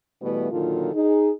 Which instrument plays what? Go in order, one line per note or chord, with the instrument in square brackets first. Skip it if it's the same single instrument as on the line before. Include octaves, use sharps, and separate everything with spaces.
[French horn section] B2 E3 G3 A3 B3
A#2 D3 D#3 F#3 F4 A4
D#4 G#4